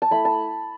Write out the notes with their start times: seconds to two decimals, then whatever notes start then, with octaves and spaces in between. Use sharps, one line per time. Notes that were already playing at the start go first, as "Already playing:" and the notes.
0.02 A5
0.11 A3 E4 B5
0.25 A5